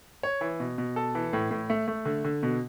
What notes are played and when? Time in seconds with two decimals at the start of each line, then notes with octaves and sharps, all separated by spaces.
0.23 C#5
0.41 E3
0.60 B2
0.78 B2
0.96 A4
1.15 E3
1.33 A2
1.51 A2
1.70 A3
1.88 A3
2.06 D3
2.25 D3
2.43 B2